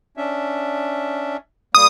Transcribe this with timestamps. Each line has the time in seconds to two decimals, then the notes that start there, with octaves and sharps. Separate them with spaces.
0.17 C#4 D4 E5
1.75 G3 A#3 D#6